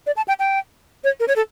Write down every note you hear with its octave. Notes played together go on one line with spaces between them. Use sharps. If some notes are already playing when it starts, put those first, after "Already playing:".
D5
A5
G5
G5
C#5
A#4
C#5
A4